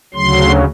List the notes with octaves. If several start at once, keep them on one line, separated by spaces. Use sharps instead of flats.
D2 C#3 F#3 C6